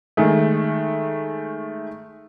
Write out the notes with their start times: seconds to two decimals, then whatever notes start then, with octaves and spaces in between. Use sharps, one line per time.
0.17 D#3 G#3 A3